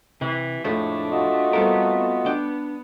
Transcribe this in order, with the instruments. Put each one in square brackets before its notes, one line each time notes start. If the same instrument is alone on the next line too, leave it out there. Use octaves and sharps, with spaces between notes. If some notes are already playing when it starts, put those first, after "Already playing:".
[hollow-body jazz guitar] C3 [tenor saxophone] E3
[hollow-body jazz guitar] F2 A2 G#3 [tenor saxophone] A3 [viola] D4
[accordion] F4 F#4 D#5
[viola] G3 B3 [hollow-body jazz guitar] C4 A4 A#4
[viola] B3
[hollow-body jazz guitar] D4 G5